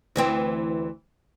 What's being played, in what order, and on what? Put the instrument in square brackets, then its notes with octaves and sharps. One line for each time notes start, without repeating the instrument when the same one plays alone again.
[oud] D2 E3 C4